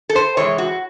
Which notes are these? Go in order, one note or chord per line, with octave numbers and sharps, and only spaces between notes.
A4
C5
C3 E3 G#3 C#5
F#4